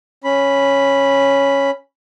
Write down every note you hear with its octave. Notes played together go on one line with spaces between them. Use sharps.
C#4 B5